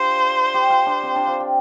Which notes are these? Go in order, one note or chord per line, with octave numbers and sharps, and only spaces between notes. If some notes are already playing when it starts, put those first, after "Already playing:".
Already playing: D4 F4 G4 C5
G4
F4
D4
C4
D4
F4
G4